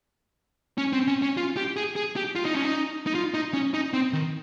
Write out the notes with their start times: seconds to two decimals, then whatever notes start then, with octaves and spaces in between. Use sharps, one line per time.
0.78 C#4
0.93 C4
1.07 C#4
1.22 C#4
1.37 F4
1.57 G4
1.76 G#4
1.96 G#4
2.16 G4
2.36 F4
2.45 D#4
2.55 C#4
2.64 D#4
3.07 D#4
3.15 F4
3.34 D#4
3.54 C#4
3.74 D#4
3.93 C4
4.13 D#3